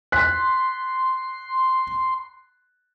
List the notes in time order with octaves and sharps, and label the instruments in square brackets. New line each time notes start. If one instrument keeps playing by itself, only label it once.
[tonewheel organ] C6 [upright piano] F#6 B6